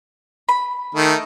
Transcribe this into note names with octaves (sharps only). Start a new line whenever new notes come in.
B5
D#3 A3